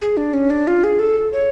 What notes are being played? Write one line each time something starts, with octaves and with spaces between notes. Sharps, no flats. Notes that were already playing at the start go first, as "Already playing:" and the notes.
G#4
D4
C#4
D4
F4
G#4
A4
C#5